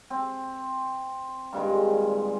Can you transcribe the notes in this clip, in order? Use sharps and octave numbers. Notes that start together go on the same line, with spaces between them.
C4
G2 A#2 D#3 G#3